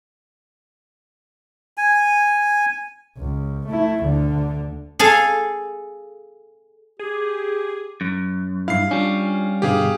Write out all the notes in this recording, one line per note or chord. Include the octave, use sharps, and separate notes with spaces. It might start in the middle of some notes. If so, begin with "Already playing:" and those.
G#5
C#2
A3 E4
D2 D3
G#4 A4 F5
G4 G#4
F#2
G2 E4 F5 C7
G3 C#4 D4 F4
G2 B2 D3 G4 G#4 F5